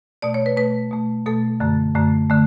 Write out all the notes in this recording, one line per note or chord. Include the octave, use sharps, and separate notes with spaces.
B2 A3 D5
C#5
B4
B2 A3 B4
B2 A3
B2 A3 A4
F#2 D3 A3
F#2 D3 A3
D3 A3